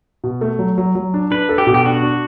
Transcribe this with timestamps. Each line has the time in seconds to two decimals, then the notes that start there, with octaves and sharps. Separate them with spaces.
0.24 B2
0.41 A3
0.59 F#3
0.78 F#3
0.95 F#3
1.14 D4
1.31 D4 B4
1.49 A4
1.58 G4
1.67 B2
1.74 G4
1.85 D4 F#4
2.03 D4